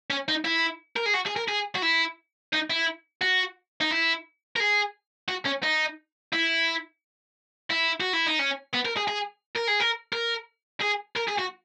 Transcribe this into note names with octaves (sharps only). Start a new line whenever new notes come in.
C#4
D#4
E4
A#4
G#4
F#4
G#4
A#4
G#4
F#4
E4
D#4
E4
F#4
D#4
E4
A#4
G#4
F#4
C#4
D#4
E4
E4
F#4
E4
D#4
C#4
B3
A#4
G#4
G#4
A#4
G#4
A#4
A#4
G#4
A#4
G#4
F#4